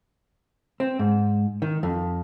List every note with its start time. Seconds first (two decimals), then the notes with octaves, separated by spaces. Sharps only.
0.80 C4
0.99 G#2
1.62 D#3
1.83 F2